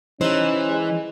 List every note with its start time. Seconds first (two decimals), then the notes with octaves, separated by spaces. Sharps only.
0.21 E3 C#4 D#4 G4 C5
0.69 G#3